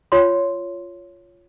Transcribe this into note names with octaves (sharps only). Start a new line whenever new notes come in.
F4 C#5 C6